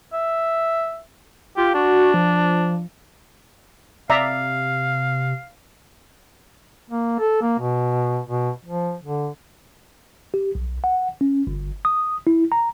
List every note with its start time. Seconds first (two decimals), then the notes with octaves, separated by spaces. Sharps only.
0.13 E5
1.57 F4 G4
1.74 D4 F#4
2.14 F3
4.10 C3 D5 E5 F5 A#5
6.90 A#3
7.19 A4
7.41 A#3
7.59 B2
8.26 B2
8.65 F3
9.03 D3
10.34 G4
10.55 B1
10.84 F#5
11.21 C#4
11.47 G1
11.85 D#6
12.27 E4
12.52 A#5